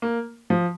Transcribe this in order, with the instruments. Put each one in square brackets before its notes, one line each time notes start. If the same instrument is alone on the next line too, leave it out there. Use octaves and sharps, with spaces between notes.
[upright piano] A#3
F3